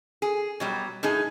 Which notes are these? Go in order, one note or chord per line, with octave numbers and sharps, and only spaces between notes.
G#4
B2 F#3 G3
A2 D#4 G#4